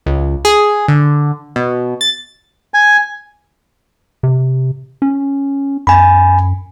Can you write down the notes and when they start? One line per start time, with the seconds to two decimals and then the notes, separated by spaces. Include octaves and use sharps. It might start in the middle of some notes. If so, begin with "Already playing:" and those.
0.06 C#2
0.45 G#4
0.88 D3
1.56 B2
2.01 A6
2.74 G#5
4.23 C3
5.02 C#4
5.87 F#2 G#5 B5